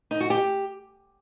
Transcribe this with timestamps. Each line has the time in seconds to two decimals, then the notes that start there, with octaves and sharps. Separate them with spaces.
0.11 D#4
0.20 F#4
0.30 G4